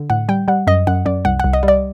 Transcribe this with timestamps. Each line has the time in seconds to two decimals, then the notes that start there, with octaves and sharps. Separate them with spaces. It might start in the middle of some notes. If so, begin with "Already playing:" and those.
Already playing: D3
0.10 A2 F#5
0.29 G3 G5
0.48 G3 F#5
0.67 F#2 D#5
0.87 F#2 F#5
1.06 F#2 D5
1.25 C2 F#5
1.40 F#5
1.44 C2
1.53 D#5
1.63 G3
1.68 D5